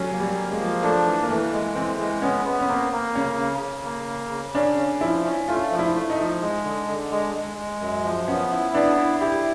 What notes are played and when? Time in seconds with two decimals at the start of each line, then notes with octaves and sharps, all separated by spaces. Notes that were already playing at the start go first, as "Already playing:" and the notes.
Already playing: F#3 G3 C#4
0.12 A#3
0.20 G3
0.35 A#3
0.52 G#3
0.59 F3
0.82 A3 D4
1.06 E3
1.22 A#3
1.29 E3 A3
1.52 G#3
1.75 E3 C4
1.99 G#3
2.22 B3 C#4
2.45 B3
2.60 C#4
2.68 A#3 C4
2.92 A#3
3.15 C#3 C#4
3.39 C#3
3.61 C#3
3.85 A#3
4.08 C#3
4.31 C#3
4.55 C#4 D4
4.78 C#4
5.01 F3 E4
5.25 C#4
5.48 A3 F4
5.71 F3
5.79 E4
5.95 A3
6.10 D#4
6.18 F3
6.41 G#3
6.64 D3
6.88 D3
7.11 G#3
7.35 G#3
7.57 G#3
7.81 F#2
8.04 F3
8.27 B3 C#4
8.51 E4
8.74 B3 D4
8.97 E4
9.20 E4 G4